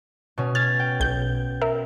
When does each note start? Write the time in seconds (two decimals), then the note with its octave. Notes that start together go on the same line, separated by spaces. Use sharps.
0.38 B2 C#4
0.55 F6 G#6 A6
0.79 G5
1.00 B1 G6
1.62 A#4 E5